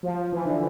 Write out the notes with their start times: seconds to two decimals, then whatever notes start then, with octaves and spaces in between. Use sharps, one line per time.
0.03 F3
0.32 E3
0.45 D3